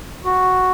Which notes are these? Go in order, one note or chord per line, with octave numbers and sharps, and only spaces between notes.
F#4